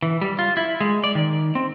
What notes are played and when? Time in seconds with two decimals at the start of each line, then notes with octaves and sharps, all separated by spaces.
0.03 E3
0.21 G3
0.39 F4
0.57 E4
0.81 G#3
1.04 D5
1.15 D#3
1.55 C4